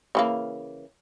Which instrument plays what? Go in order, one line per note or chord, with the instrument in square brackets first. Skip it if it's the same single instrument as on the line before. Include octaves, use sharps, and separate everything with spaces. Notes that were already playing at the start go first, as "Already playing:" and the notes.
[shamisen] C#3 E3 A#3